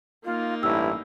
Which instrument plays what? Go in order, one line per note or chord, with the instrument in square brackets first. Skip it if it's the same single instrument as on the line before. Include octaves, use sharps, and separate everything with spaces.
[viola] A#3 D#4 [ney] F4
[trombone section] A1 G2 G4 [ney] E4 [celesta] E6